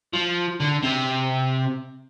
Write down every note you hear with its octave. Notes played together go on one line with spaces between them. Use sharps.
F3
D3
C3